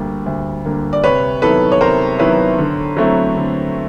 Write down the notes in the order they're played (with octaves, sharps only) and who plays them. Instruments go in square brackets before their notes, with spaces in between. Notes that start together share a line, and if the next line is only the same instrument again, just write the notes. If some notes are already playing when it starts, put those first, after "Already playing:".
Already playing: [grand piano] D2 D3 G3 A#3
D2
D3 G3 A#3
[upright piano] D5
[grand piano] C3 [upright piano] B4 C#5
[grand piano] D#3 F#3 B3 E4 [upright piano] A4 B4
[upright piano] C#5
[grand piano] C3 [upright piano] A#4 C5
[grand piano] D#3 F#3 B3 E4 [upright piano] B4 C#5
[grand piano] D3
F#3 A3 C4 E4
D3